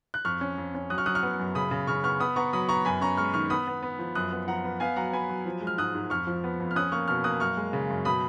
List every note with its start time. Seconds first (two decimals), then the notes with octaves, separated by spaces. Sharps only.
0.14 F#6
0.25 F2 C#6 F6
0.41 C#4
0.58 F2
0.75 C#4
0.90 F#3 D#6 F#6
0.98 C#6 F6
1.06 F#3 D#6 F#6
1.15 C#6 F6
1.23 B3
1.39 F#2
1.55 C#3 B5 D#6
1.71 C#3
1.87 C#3 C#6 F6
2.04 B3 C#6 F6
2.20 B3 B5 D#6
2.36 B3 A#5 C#6
2.53 F#3 B5 D#6
2.69 B3 A#5 C#6
2.85 F#2 G#5 B5
3.01 C#4 A#5 C#6
3.17 G#3 C#6 F6
3.34 D#3 C#6 F6
3.50 B3 B5 D#6
3.67 B3
3.82 B3
3.99 F3
4.15 F#2 D#6 F#6
4.32 B3
4.47 F3 F#5 A#5
4.64 B3
4.80 B3 F5 G#5
4.96 F#3 F#5 A#5
5.13 B3 G#5 B5
5.29 F#3
5.46 F3
5.61 G#3
5.67 F6
5.78 G#2 D#6 F#6
5.95 G#2
6.10 F2 C#6 F6
6.27 F3
6.44 B3
6.60 F2
6.71 F6
6.76 C#4 D#6 F#6
6.92 A#3 C#6 F6
7.08 B2 C#6 F6
7.24 A#3 D#6 F#6
7.40 F#2 C#6 F6
7.57 G#3
7.73 C#3
7.90 F#2
8.05 B2 B5 D#6